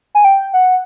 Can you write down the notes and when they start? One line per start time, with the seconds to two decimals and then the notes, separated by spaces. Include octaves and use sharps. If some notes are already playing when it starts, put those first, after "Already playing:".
0.15 G#5
0.25 G5
0.54 F#5